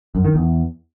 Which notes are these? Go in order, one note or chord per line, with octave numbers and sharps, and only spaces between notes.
F#2
D#3
E2